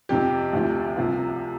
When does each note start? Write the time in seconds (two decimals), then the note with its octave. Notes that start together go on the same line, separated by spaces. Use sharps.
0.09 F2 C3 F3 G4
0.53 D2 C3 F3
0.97 C2 C3 F3 F4